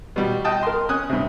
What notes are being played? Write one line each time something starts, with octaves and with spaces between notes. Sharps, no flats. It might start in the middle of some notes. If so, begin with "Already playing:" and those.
B2 G3
D#5 G5 A5 D#6
A#4 C6
C#4 G#5 D#6 F#6
G2 C3